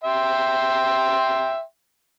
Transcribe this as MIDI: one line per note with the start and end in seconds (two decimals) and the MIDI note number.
0.04 1.61 76
0.04 1.61 79
0.04 1.61 84